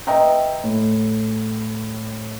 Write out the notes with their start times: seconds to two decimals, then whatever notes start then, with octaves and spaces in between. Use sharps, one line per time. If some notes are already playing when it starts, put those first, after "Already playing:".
0.07 B4 D#5 E5 G5 A#5
0.64 A2